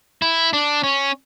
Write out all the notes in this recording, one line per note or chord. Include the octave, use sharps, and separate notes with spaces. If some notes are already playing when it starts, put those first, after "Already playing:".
E4
D4
C#4